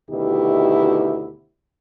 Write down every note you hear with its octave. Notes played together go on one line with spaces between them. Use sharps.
D2 B2 D#3 E4 G4